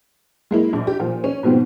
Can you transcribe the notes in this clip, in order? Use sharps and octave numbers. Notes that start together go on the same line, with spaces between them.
G#3 A#3 E4
A#1
G4
A#2 F3
C#4
G#2 B2 F3 B3 C4